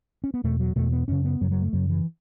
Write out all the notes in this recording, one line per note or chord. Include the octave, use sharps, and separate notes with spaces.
C#4
B3
E2 B2 A3
F#3
E2 B2 A3
B3
F#2 C#3 C#4
B3
F#2 C#3 F#3
F#3
A3
F#2 C#3 F#3
E3